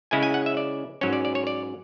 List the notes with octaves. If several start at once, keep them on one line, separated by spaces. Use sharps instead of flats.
C#3 G#3 C#4 E4 G#5
G#5
F#5
E5
D5
G#2 F#3 C#4 C#5
D5
D5
C#5
D5